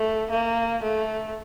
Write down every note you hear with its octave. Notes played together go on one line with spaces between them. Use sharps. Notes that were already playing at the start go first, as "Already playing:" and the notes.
Already playing: A3
A#3
A3